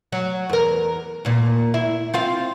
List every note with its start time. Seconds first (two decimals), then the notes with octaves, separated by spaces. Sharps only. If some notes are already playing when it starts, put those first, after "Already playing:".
0.12 F#3
0.49 E2 A#4
1.25 D#2 A#2
1.74 E4
2.14 C4 F4 F5